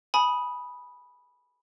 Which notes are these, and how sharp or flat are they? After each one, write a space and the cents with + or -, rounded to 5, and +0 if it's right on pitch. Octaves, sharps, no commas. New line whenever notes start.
G#5 +20 B5 -10 D#6 +0